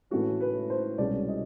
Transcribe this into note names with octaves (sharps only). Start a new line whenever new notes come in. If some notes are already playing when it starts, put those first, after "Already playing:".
A2 E3 A3 C#4 F#4
B4
C5
C2 B2 G#3 C#4 D5
D#5